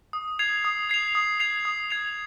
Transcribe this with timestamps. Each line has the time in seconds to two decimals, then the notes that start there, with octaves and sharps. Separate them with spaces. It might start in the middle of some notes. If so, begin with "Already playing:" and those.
0.13 D#6
0.39 G#6 C7 F7
0.65 D#6
0.89 G#6 C7 F7
1.15 D#6
1.40 G#6 C7 F7
1.65 D#6
1.90 G#6 C7 F7